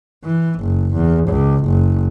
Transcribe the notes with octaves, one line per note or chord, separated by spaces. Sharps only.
E3
F#1
E2
C#2
F#1